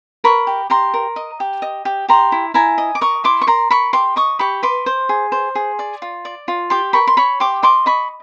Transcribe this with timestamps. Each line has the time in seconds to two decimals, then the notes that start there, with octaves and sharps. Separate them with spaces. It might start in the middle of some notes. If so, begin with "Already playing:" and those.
0.24 A#4 B5 C#6
0.47 G4
0.70 G4 A#5 C6
0.94 A#4
1.16 D#5
1.40 G4
1.62 D#5
1.85 G4
2.09 G4 A#5 C6
2.32 E4
2.54 E4 G#5 A#5
2.78 D#5
2.95 D6
3.01 A#4 C#6 D#6
3.24 E4 C6 D6
3.42 C#6
3.47 A#4 A#5 C6
3.71 A#4 B5 C#6
3.93 G4 C6 D6
4.16 D#5 C#6 D#6
4.39 G4 B5 C#6
4.63 B4 C6 D6
4.86 C5
5.09 G#4
5.32 C5
5.55 G#4
5.79 D5
6.02 F4
6.25 D5
6.48 F4
6.70 G4 C6 D6
6.93 A#4 B5 C#6
7.08 C6
7.17 C#5 B5 C#6
7.40 G4 C6 D6
7.63 D#5 C6 D6
7.86 D#5 B5 C#6